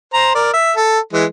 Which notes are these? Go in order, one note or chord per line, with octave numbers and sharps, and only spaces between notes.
C5 A#5
A#4 D5
E5
A4
E3 G#3